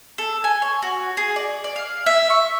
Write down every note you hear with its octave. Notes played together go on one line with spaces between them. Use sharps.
A4
G#5
C#5
F#4
G#4
D5
D5
F5
E5
C#6